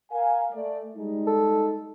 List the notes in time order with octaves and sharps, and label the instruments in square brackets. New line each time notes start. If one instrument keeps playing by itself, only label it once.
[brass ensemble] A#4 F5 G#5
A3 D5
G3 G#3 D#4
[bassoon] A4